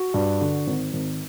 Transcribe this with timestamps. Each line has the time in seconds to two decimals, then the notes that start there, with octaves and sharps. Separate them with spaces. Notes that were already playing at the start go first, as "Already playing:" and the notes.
Already playing: F#4
0.14 G2
0.41 D3
0.67 G#1
0.93 G#1